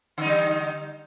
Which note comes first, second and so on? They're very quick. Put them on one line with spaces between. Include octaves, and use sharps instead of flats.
D3 D#4 G3